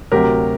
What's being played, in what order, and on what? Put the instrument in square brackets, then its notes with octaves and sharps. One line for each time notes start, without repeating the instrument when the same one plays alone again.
[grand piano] D2 C3 F#3 G4 A#4